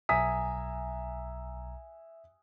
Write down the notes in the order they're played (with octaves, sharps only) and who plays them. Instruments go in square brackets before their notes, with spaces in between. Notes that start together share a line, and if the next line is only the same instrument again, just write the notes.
[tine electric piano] B1 A#5 [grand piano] E5 D#6 B6 [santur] G#5